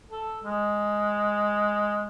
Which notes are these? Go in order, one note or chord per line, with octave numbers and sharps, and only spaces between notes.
A4
G#3